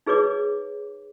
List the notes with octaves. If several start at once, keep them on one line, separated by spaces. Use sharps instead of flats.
D#4 G#4 B4 C#5 D6